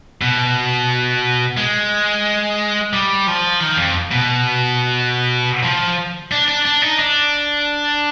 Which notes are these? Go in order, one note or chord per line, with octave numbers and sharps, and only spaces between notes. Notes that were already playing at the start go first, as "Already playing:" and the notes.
B2
G#3
G3
F3
D#3
F2
B2
F3
D4
D4
D4
D#4
D4